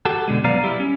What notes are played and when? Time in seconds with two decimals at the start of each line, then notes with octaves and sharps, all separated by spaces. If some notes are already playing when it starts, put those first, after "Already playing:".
0.05 F#4 G4 A4
0.28 B2 D3 G#3
0.44 B1 F#3 B3 D5 F5 A#5
0.64 G3 E4 G4
0.80 C#4